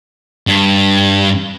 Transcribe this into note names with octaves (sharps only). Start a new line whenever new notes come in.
G2